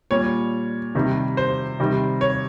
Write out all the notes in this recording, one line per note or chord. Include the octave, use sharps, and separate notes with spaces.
A#2 G3 C#5
C3 D#3 G3
C5
C3 D#3 G3
C#5